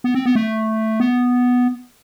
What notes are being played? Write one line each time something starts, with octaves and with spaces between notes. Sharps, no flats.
B3
C4
B3
A3
B3